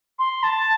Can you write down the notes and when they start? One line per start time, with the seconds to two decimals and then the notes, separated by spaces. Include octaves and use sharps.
0.19 C6
0.43 A5